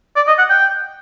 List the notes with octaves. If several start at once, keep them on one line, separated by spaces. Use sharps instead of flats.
D5
D#5
F#5
G5